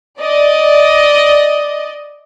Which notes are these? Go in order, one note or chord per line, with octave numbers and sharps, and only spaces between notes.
D5 D#5